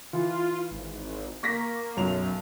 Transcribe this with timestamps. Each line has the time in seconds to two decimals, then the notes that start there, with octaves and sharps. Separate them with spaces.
0.13 E3 F4
0.71 G#1
1.43 A#3 C#6 A#6 B6
1.97 B1 F#2 F7